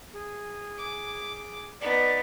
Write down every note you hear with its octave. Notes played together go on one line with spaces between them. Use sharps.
G#4
D6
B3 D#4 D5